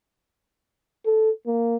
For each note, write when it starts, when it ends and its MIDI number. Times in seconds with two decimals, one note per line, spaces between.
1.06 1.31 69
1.47 1.77 58